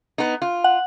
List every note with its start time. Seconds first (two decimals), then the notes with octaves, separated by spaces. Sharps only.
0.18 B3 D#4
0.42 F4
0.64 F#5